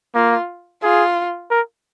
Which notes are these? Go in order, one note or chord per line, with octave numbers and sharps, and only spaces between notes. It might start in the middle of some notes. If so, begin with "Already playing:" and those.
A#3 F4
F4 G#4
A#4